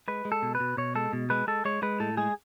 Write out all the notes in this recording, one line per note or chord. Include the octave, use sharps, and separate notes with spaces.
G#3 B4
G#3
A4
B2
B4
B2
B2 C#5
G#3 A4
B2
G#3 B4
G#3 A4
G#3 C#5
G#3 B4
A2 A4
G#3 G#4